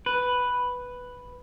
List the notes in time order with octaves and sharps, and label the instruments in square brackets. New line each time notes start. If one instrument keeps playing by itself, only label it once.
[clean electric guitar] B4